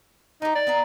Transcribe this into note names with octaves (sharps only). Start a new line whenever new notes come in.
D#4 G4 A#5
D5
B3 B4 A#5